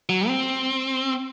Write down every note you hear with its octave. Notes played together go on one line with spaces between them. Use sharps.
F#3
C4